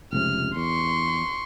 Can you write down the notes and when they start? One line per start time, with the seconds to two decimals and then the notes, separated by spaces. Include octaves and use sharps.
0.13 F1 C#2 C3 F6
0.56 E2 C6 C#6